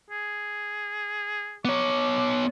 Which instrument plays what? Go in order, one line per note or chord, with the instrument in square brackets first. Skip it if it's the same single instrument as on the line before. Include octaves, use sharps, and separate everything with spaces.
[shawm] G#4
[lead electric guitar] B3 C#5 [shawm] D6